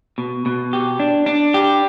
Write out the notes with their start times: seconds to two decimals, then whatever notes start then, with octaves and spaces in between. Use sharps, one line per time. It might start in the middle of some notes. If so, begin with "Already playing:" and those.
0.18 B2
0.46 B2
0.73 G4
1.00 D4
1.26 D4
1.54 G4